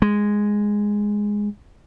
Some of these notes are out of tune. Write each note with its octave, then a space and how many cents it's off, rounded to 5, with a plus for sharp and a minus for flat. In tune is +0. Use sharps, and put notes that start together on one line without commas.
G#3 -5